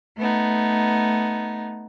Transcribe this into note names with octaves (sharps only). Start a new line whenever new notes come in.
A3 B3 D#4